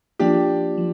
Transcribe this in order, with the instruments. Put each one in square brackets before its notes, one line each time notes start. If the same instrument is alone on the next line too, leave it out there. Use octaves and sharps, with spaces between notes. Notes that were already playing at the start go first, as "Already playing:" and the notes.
[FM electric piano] F3 A#3 F4 [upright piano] D4 G4
[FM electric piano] F3